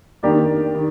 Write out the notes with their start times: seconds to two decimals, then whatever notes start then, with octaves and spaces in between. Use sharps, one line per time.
0.23 D#3 A#3 D4 G4 D5
0.75 D#3